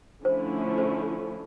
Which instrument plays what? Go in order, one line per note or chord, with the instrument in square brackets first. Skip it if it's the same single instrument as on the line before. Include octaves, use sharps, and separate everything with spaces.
[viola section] D3 F3 A3 C#4 E4 [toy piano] C5
[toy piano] C5